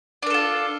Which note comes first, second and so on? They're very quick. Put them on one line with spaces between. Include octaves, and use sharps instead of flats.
D4 A#4 A4 F4